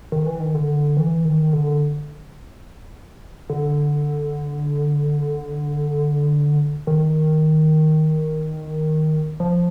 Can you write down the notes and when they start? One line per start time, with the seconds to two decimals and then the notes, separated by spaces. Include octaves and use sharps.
0.12 D#3
0.26 E3
0.40 D#3
0.54 D3
0.97 E3
1.25 D#3
1.53 D3
3.50 D3
6.87 D#3
9.40 F3